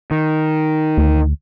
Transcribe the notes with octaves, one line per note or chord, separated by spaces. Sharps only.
D#3
D2